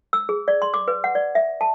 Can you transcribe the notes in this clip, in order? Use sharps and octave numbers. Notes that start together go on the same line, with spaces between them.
E6
G#4
D5
C6
D6
B4
F#5
D5
E5
A5